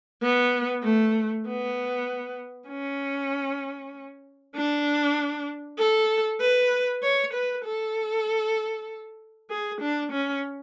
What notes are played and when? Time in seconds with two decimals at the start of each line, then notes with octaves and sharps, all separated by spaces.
0.22 B3
0.83 A3
1.46 B3
2.69 C#4
4.55 D4
5.78 A4
6.40 B4
7.03 C#5
7.33 B4
7.64 A4
9.50 G#4
9.81 D4
10.12 C#4